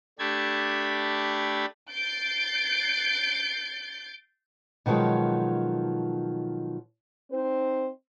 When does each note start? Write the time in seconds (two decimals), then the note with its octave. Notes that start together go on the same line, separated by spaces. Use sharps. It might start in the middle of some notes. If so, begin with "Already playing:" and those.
0.19 A3 D4 G4 A5 B5 G#6
1.92 G6 A6 C7 D7
4.86 B2 D#3 F3 F#3 G#3
7.31 C4 D#4 C5